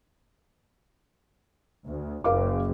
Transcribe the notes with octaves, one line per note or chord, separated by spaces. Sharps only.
D2
F#1 A#4 F5 D6